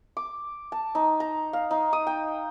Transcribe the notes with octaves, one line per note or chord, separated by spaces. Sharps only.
D6
A5
D#4
A#5
F5
D#4
D#6
G5